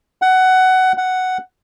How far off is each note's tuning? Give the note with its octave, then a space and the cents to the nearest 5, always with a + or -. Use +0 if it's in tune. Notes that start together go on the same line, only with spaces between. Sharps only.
F#5 +15
F#5 +5